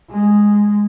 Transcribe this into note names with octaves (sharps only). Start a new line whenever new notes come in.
G#3